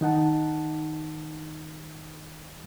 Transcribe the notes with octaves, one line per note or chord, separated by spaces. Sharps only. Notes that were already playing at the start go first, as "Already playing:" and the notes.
D#3 D#4 F#5 A5